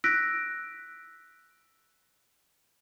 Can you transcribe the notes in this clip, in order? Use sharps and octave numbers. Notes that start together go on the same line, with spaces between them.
E6 F#6 A#6 B6 D7